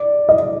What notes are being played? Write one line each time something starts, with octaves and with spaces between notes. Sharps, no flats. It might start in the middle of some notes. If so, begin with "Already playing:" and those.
Already playing: D5
D#5